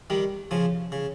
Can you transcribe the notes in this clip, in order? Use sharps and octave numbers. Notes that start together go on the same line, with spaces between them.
D#3 G3
C#3 F3
C#3